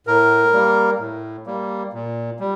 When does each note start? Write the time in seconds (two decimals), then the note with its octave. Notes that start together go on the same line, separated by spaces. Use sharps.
0.07 A2 A#4
0.53 G3 A#3
0.99 A2
1.46 G3 A#3
1.93 A#2
2.39 G3